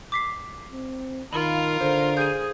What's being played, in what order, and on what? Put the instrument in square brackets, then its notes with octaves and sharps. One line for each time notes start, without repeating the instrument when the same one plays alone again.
[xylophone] D6 B6 C7
[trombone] C4
[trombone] D#3 [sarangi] F4 [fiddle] A#4 F5 [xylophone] B5
[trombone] D3 [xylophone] C5
[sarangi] G#4 [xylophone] G6 D#7